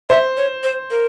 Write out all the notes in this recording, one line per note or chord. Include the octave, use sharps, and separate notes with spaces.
C5 E5
C#5
C5
A#4